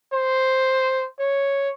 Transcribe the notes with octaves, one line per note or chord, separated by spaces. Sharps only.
C5
C#5